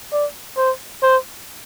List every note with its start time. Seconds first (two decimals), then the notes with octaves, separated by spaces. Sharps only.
0.12 D5
0.57 C5
1.03 C5